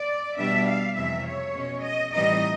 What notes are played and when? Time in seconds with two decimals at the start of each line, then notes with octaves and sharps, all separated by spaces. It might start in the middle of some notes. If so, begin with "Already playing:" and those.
Already playing: D5
0.38 B2 G3 B3 D4 E5
0.67 F5
0.96 F2 C3 E3 G#3 E5
1.26 C#5
1.55 B2 G#3 C#4
1.83 D#5
2.13 A2 E3 G3 C4 D#4 D#5